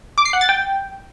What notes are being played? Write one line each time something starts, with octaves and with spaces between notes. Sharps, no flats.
D6
C7
F#5
A6
G5